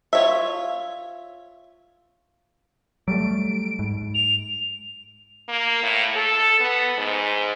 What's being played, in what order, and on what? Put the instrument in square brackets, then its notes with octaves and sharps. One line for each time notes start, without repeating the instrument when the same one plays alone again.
[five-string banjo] F4 C#5 E5
[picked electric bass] F#3 G3 A3 [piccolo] D7
[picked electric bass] G#2
[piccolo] F7
[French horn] A#3
A2
A4
B3
G#2